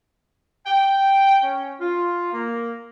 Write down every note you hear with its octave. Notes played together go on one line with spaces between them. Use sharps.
G5
C#4
F4
A#3